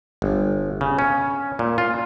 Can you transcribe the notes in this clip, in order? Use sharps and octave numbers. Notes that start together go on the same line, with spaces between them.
G1
C#3
C#4
A#2
F4